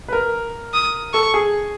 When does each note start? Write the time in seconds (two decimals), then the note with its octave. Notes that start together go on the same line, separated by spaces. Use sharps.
0.08 B4
0.13 A#4
0.74 D#6
1.13 A4 C#6
1.34 G#4